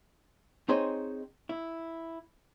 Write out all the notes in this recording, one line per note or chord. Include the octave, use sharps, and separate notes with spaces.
C4 D#4 G#4 C5 C#5 D#5
E4